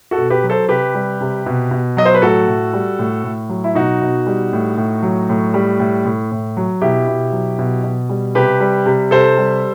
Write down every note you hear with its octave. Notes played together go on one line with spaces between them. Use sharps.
F#4 A4
B2
G4 B4
F#3
A4 C5
C3 G4 B4
G3
C3
B2
B2
F#3 D#5
C5
B4
A2 F#4 A4
A2
G3
A2
A2
F#3
E4
B2 D#4 F#4
B2
G3
A2
A2
F#3
A2
G3
A2
A2
A2
F#3
B2 E4 G4
B2
F#3
B2
B2
G3
C3 G4 B4
G3
C3
C3 A4 C5
G3